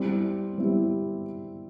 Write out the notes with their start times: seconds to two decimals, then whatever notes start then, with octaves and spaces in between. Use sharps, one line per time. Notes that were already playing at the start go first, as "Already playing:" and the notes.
Already playing: G3 C4 E4 G4
0.58 G3 C4 E4 G4